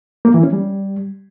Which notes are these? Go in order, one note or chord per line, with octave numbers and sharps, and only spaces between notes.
A#3
E3
C#4
G3